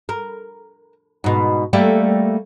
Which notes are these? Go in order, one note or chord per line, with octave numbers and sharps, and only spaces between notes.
A#4
G#2 B2
G3 A3 A#3